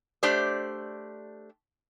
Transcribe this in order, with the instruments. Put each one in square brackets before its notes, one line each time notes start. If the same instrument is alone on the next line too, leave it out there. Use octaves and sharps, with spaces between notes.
[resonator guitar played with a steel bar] A3 D4 G4 C5 D5